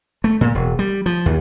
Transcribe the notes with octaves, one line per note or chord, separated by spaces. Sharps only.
A3
A#2
E1
G3
F3
D#2